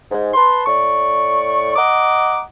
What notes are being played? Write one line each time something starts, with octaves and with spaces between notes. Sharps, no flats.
G#2
B4 A5 C6
A2 D5 C#6
D#5 F#5 A#5 D6